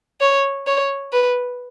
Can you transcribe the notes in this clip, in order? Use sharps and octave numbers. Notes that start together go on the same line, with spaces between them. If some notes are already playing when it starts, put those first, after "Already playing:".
C#5
C#5
B4